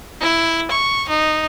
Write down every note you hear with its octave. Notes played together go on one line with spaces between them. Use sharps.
E4
C#6
D#4